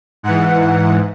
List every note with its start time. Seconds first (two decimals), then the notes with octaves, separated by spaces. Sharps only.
0.23 G#2 E3 F#5